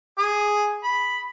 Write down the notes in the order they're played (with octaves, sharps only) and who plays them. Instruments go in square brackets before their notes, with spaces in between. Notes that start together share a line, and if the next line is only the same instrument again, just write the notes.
[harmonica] G#4
B5